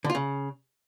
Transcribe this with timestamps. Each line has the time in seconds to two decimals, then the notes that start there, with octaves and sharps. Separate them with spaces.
0.04 D3
0.10 F4
0.15 C#3